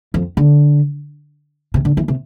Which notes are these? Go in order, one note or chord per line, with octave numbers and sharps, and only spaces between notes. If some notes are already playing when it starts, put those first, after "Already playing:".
F2
D3
C3
D3
E3
C3